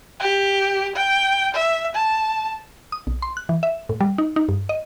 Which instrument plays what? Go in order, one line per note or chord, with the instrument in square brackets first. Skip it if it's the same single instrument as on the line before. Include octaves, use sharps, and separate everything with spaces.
[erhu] G4
G5
E5
A5
[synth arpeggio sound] D#6
B1
C6
F#6
E3
E5
A2
G3
D#4
D#4
G2
D#5